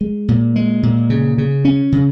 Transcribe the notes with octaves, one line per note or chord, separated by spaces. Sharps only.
G#3
A#2
G#3
A#2
C#3
C#3
C#4
C#3